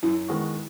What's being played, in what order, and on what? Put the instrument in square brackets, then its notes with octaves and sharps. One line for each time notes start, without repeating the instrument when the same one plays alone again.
[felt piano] F#2 [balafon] E4
[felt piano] D#3 G#3 B3 F#4